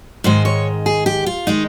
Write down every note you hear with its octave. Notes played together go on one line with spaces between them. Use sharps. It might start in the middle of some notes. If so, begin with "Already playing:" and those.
G#2 D#3 G#3 C5
C#5
G#4
G4
F4
D#3 G#3 D#4